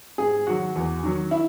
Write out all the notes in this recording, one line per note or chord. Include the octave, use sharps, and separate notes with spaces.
G#2 G#4
D#3 F#3 F#4
E2
D#3 F#3
E4